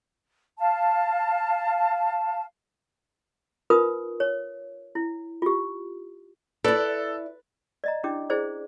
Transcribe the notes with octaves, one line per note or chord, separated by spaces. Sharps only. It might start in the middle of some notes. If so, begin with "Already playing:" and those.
F5 A5
D#4 F4 A#4 B4 D#6
C#5
E4
F4 G4
E4 A4 B4 D5
D5 D#5 A#5
C#4 D4 E4 G4 D6
E4 G#4 C5 D5